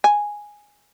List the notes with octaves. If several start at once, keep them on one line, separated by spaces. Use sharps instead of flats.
G#5